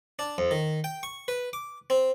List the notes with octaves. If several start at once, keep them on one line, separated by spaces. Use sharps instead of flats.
D4
F2
D#3
G5
C#6
B4
D6
C4